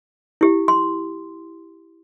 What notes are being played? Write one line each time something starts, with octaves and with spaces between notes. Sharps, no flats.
E4 G4
C6